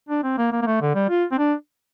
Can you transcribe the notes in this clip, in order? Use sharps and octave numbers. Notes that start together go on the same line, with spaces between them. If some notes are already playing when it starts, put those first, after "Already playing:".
D4
C4
A#3
A#3
A#3
A3
D3
G3
F4
C4
D4